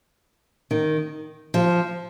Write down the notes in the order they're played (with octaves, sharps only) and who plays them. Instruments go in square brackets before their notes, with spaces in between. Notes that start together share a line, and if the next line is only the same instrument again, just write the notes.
[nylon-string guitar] D#3
F3